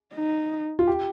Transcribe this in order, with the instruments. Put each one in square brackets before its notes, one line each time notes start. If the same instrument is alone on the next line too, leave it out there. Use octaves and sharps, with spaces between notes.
[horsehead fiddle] D#4
[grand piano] F4
G4